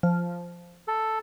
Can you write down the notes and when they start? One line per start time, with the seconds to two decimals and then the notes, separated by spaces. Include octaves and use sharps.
0.03 F3
0.88 A4